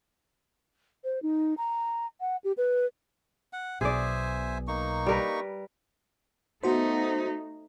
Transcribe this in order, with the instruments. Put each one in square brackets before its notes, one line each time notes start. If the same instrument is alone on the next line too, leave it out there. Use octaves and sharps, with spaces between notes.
[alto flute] C5
D#4
A#5
F#5
G4
B4
[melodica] F#5
[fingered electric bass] B1 B2 [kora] G#4 D5 [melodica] C5 E5 G#5
[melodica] A#3 D#4 C#6
[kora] G3 A#4 B4
[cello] A3 D#4 [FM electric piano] B3 F#4 C5